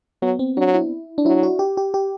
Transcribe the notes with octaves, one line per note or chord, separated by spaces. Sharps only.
F#3 B3
C4
F#3 D4
E4
D4
F#3 E4
F#4
G4
G4
G4